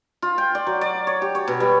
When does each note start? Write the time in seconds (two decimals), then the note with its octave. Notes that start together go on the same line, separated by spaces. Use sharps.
0.22 F4
0.38 G5
0.55 D5
0.67 F#3
0.81 D5
1.07 C#5
1.22 G4
1.35 C#5
1.48 B2
1.60 G3